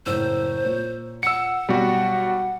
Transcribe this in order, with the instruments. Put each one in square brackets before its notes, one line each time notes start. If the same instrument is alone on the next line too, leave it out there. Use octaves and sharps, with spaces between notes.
[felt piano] F#1 A2 E6 [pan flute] C5
[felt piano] A#2 C#5
[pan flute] F#5 [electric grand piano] E6 C#7
[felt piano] B1 [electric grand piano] G3 F#4